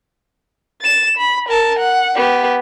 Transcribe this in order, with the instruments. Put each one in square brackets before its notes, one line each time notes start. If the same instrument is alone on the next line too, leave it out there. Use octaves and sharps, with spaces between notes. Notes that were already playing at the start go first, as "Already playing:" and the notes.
[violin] A6 E7
B5
A#4 A5
F#5
B3 G4